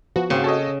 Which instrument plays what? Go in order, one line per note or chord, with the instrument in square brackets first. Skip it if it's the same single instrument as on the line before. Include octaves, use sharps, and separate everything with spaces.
[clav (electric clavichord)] F3 B3 [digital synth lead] F#4
[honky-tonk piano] G#1 [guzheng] C#3 [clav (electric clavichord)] A#3 C4
[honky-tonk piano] A4 C#5 D#5